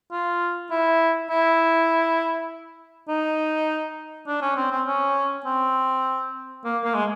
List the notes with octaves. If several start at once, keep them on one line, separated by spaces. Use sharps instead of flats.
F4
E4
E4
D#4
D4
C#4
C4
C4
C#4
C4
A#3
A#3
G#3